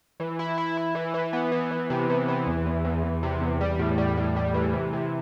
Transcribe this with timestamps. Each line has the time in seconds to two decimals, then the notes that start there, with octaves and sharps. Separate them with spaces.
0.20 E3
0.39 E4
0.58 E4
0.77 E4
0.95 E3
1.14 E3
1.33 B3
1.52 E3
1.71 E3
1.90 C3
2.10 E3
2.28 E3
2.47 E2
2.66 E2
2.85 E2
3.03 E2
3.23 C3
3.41 E2
3.61 G3
3.79 A2
3.98 G3
4.17 A2
4.36 G3
4.54 E3
4.73 C3
4.93 C3